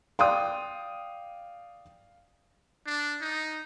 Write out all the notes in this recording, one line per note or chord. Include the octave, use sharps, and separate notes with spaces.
D5 F5 G5 C6 D#6
D4
D#4